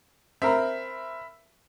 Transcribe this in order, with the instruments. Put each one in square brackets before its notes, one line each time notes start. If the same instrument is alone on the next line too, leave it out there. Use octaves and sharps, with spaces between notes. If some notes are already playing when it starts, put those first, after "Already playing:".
[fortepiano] C4 A#4 [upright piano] E5 B5